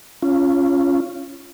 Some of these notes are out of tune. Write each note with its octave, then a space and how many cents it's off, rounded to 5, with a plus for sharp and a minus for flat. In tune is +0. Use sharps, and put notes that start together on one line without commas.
C#4 +0 F4 -15